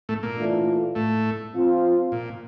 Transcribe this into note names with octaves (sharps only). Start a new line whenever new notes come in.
A2 A3
A#2 A#3
E3 A3 D4 F4
A2 A3
F3 C4 F4
A#2